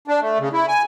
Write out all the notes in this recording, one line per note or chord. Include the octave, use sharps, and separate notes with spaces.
D4
A3
C#3
E4
G#5